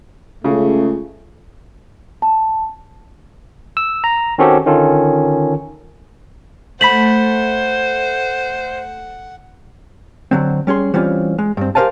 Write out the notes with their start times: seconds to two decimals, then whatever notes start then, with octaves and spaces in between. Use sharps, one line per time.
0.44 C#2 C#3 A3
2.22 A5
3.77 E6
4.04 A#5
4.38 D#3 C4 C#4 F#4 G4 A4
4.66 D3 D#3 C#4 F4 A4
6.81 A3 C5 F#5 B5 B6 F#7
10.31 D3 F#3 C4
10.67 G3 C#4 G#4 C6
10.94 E3 G3 C4 C#4 F4
11.38 G#3
11.57 G2 C4
11.75 G4 A#4 C5 F5 G#5 A5